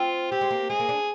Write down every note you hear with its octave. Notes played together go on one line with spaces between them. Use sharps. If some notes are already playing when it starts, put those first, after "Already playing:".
Already playing: C4 F4
C4 G4
G#3
A#3
G#3 G#4
A#3
D4